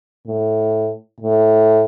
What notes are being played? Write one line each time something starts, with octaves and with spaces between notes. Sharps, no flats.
A2
A2